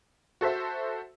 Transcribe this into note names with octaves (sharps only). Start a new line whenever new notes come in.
F#4 A4 C5 E5